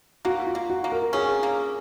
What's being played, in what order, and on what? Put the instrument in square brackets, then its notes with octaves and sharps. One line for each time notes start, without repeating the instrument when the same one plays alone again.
[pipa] A#3 [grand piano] F#4
[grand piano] F4
[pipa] A#3
[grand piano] F#4
[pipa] A#3
[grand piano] A#4
[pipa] C#4 [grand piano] G#4
[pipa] A#3